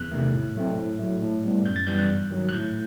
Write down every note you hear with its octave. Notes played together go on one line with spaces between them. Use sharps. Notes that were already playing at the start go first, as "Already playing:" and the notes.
Already playing: E2 F#6
C3 D#3 A3
A2
F#3 A3 C4
A2
F#3 A3
A2
G3 B3
F#2 G6
A6
E3 G3 B3 G6
F#6
G2
D#3 F#3
F#6
A2 G6